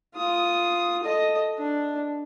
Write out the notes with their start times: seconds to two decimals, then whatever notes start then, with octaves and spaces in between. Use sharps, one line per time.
0.15 F4 D#6
1.03 A4 D#5
1.58 D4